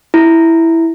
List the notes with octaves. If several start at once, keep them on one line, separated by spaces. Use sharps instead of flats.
E4